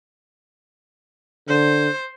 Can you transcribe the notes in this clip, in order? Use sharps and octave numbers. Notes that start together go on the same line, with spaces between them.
D3 C5